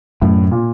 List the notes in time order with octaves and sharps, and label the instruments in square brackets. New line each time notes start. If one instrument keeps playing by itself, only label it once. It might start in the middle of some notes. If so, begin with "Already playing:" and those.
[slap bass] F#2 [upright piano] A2
[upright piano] A#2